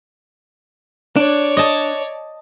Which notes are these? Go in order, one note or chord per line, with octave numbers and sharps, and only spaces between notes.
D4 C#5 D5
D#5 A5